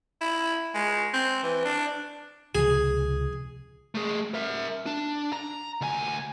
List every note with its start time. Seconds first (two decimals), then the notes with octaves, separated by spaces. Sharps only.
0.21 E4
0.74 G#3
1.13 C4
1.43 E3
1.65 D4
2.55 C#2 C3 F3 G#4
3.95 A3 G#4
4.34 A#4 E5
4.86 D4
5.33 A#5
5.81 D2 G#5